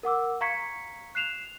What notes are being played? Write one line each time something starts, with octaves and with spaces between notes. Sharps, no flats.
A#4 F#5 D6 E6
F5 A#5 C#6 G#6 B6 C#7
F#6 C7 E7 F7